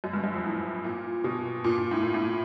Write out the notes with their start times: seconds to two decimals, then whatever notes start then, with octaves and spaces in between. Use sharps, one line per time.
0.04 F#2
0.13 G2
0.24 F#2
0.34 F2
0.44 A2
0.84 A#2
1.24 B2
1.64 A#2
1.78 A#2
1.91 A2
2.03 A#2
2.14 A2